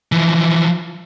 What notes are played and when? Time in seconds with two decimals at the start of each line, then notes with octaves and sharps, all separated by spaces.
0.12 E3 F3